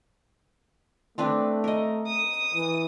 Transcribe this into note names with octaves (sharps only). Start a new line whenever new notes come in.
A3 C4 D4 B4
A#4 D#5
D#6
E3